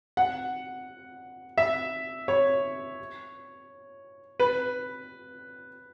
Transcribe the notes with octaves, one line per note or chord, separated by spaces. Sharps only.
F#5
E5
C#5
B4